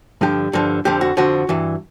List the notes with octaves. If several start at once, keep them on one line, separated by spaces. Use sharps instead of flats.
G2 D3 F3 G4
G2 D3 F3
F2 D3 F3 G4
F#4
F2 D3 F3 F#4
G2 E3